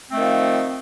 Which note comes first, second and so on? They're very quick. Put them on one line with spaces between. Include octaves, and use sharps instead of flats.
C4 A3 D#3 F3